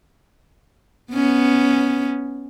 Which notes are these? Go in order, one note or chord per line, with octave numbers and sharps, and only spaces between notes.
B3 C#4